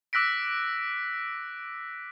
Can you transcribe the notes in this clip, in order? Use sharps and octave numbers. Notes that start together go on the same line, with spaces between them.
D6 E6 F#6 A#6 B6 D7